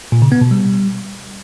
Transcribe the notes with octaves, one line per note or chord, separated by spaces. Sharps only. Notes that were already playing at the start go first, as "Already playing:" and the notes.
A#2
C#3
B3
B2
G3